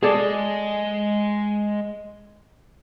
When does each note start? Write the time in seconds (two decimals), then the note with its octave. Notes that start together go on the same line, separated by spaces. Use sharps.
0.03 G#3 G#4 A4 D5